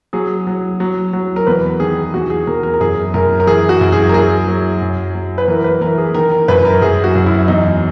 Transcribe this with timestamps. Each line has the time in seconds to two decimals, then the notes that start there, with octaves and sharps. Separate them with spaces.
0.13 F#3 G#4
0.47 F#3
0.80 F#3
1.13 F#3
1.36 A#4
1.47 E2 B4
1.80 D#3 G#4
2.14 E2 F#4
2.30 G#4
2.47 E2 A#4
2.63 A#4
2.74 A#4
2.80 F#2 G#4
3.14 F#2 A#4
3.40 A#4
3.47 E3 G#4
3.69 F#4
3.81 F#2
3.92 G#4
4.09 A#4
4.14 F#3 G#4
4.48 F#3
4.81 F#2
5.14 F#3
5.38 B4
5.48 E3 A#4
5.64 B4
5.81 E3 A#4
5.98 G#4
6.14 D#3 A#4
6.32 A#4
6.48 F#2 B4
6.65 A#4
6.82 F#2 G#4
7.04 F#4
7.15 F#2
7.26 E4
7.48 E2 D#4